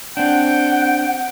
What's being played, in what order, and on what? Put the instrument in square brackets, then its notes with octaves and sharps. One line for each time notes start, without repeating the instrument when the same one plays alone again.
[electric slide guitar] C4 D4 [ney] F#5 [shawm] G5